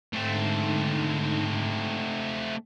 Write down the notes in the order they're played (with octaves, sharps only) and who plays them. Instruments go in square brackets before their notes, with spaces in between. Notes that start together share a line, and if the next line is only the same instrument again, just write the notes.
[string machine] G#2 D3 D#4 [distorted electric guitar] A3 C4